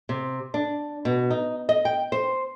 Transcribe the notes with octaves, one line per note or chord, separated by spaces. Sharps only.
C3
D4
B2
D#4
D#5
G5
C5